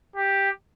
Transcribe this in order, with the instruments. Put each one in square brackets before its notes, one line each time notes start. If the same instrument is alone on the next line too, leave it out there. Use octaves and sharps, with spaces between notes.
[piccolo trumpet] G4